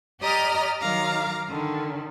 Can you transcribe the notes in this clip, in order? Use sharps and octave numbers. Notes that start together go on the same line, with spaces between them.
G4 D5 D#5 A#5 D#6 F6
D#3 F#3 F5 A#5 D6
D3 D#3